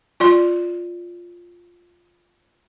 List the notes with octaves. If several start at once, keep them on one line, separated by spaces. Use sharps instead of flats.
F4 D5 C6